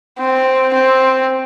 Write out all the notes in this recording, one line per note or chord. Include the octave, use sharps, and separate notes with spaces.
C4
C4